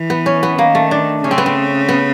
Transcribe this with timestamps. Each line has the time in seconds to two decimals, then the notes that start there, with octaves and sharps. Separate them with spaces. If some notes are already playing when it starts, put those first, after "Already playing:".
Already playing: E3
0.10 B3
0.26 C#4
0.43 B3
0.58 D#3 A#3
0.75 A3
0.91 D4
1.24 C#3 C#4
1.31 C4
1.38 B3
1.46 C4
1.89 B3